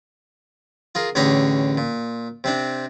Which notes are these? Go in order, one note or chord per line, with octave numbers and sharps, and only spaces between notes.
F4 G#4 A#4
A1 D3 G4 G#4 C#5 A#5
A#2
C3 C4 D4